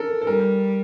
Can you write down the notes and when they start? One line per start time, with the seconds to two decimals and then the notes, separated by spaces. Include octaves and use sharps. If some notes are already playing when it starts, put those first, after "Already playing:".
Already playing: A4 A#4
0.22 A4
0.26 G3 A#4